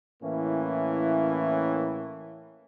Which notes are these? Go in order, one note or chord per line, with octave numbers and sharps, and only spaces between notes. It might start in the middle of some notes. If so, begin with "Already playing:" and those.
A2 E3 A#3 C#4 E4